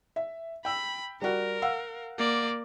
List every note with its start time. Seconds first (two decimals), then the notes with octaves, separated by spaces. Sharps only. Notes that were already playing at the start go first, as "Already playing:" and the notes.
0.16 E5
0.65 G5 B5 E6
1.22 G3 F#4 A#4
1.62 F5 F#5 E6
2.18 A#3 D5